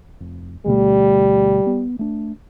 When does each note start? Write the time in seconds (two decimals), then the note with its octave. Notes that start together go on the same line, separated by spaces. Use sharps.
0.20 F1
0.66 D2 B2 G3 A3
1.66 B3
1.99 A3 D4